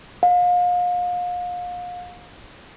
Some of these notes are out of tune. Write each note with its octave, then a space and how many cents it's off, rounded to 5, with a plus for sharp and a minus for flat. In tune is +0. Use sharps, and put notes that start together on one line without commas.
F5 +35